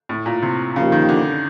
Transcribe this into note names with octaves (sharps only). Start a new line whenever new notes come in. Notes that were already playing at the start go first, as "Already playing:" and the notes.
A2
A#2
C3
A#2 C#3 F3 A#3 D#4 G4
D#3
D3